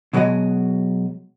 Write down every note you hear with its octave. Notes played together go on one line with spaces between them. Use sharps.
B2 F#3 G#3 F#4 D#5